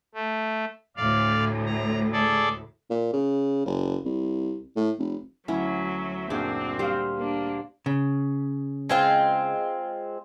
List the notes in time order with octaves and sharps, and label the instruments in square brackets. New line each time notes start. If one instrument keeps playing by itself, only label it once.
[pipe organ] A3
[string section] D2 A2 [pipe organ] D5 F5
[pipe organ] A#5
G#4 A4 D5
[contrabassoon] A#2
C#3
F#1
C2
A2
F1
[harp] D2 [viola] F#3 E5 [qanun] C#4 E4
[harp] F#2 A#2 G#4 [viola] C4 [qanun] D4
[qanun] G3 [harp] C5 F5
[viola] A#3 D4
[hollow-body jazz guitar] C#3
[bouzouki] G#3 C4 F4